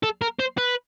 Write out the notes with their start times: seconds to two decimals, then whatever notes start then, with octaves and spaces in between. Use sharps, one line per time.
0.03 A4
0.22 A#4
0.40 C5
0.58 B4